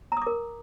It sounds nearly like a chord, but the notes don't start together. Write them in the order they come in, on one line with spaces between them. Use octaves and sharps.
A#5 D#6 D6 A#4